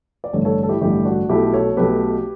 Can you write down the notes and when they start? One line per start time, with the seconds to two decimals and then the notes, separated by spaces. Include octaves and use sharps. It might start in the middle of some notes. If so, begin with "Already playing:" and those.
0.24 D5
0.33 A1 G2 D3 A4 C#5
0.45 A4 C#5
0.63 A4
0.69 E4 G4
0.81 A1 G2 D3 E4 G4
1.05 D4 F#4
1.29 B1 B2 A3 E4 G4
1.53 A4 C#5
1.77 B1 B2 A3 G4 B4